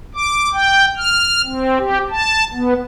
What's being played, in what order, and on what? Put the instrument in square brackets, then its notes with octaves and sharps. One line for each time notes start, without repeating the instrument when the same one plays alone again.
[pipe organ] D6
G5
F6
C4
G4
A5
B3